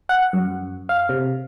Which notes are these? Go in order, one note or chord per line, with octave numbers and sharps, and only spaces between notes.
F#5
F#2
F5
C3